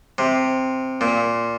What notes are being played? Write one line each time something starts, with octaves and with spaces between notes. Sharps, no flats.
C3
A#2